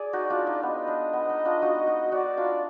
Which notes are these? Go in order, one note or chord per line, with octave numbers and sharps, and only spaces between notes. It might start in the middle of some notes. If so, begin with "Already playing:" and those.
Already playing: G#4 D5
D#4 F#4
D4 F4
D#4
B3 D#5
D4
B3
D#4
D4 F4
D#4 F#4
D#4 F#4
D#4 F#4 D5
D4 F4